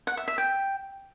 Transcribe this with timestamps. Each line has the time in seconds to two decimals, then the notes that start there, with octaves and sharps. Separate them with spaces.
0.07 F#5
0.17 E5
0.28 E5
0.38 G5